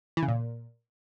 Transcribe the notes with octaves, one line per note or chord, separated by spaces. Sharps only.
E3
C#3
A#2